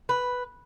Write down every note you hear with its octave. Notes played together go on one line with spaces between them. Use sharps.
B4